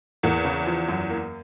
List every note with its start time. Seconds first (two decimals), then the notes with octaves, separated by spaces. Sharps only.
0.23 E2 E3 A#3
0.44 C#3
0.66 F3
0.89 F#2
1.10 A#3